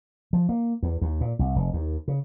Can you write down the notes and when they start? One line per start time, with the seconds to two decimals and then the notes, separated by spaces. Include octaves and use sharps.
0.33 F3
0.49 A#3
0.83 E2
1.01 D#2
1.21 A#2
1.39 C2
1.56 F1
1.73 D#2
2.08 C#3